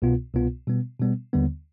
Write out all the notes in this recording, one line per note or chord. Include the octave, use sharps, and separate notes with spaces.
C2 B2 B3 F4
C2 B2 B3 F4
B2 G3 B3
B2 G3 B3
D#2 D3 G3 B3